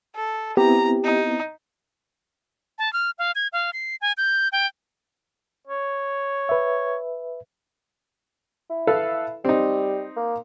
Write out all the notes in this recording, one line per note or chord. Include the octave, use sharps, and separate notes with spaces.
A4
B3 C4 E4 G4 A#5
D#4
A5
F6
F5
G#6
F5
C7
G#5
G6
G5
C#5
B4 E5
E4
A4 B4 F5
G3 C4 D#4
A#3